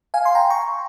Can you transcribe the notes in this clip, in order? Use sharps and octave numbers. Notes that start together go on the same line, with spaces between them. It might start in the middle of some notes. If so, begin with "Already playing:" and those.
F5 G#5
C6
G5 A#5
A#5 C#6